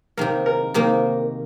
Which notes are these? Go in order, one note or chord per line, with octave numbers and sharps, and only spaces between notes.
C3 D#3 A#3 A#4
A#4
C3 D#3 A#3 A#4